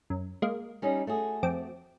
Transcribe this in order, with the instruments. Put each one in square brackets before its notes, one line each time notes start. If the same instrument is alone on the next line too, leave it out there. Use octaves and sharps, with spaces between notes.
[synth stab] F#2
G#3 A#3
[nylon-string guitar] G3 C#4 D#4
A3 F#4 G#4
[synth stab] F2 C4 D6